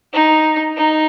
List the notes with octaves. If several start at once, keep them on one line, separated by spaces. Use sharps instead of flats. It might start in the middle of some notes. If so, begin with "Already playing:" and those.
D#4
D#4